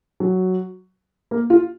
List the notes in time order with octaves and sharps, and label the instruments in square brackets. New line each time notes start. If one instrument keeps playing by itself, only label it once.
[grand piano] F#3
A#3
F4